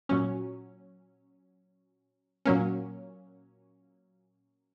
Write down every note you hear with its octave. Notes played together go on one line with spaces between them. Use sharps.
A#2 F#3 C#4
A#2 F#3 A#3 C#4